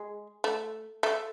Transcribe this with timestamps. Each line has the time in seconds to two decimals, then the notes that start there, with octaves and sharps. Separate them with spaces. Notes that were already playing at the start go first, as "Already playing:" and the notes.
Already playing: G#3
0.44 A3
1.03 A3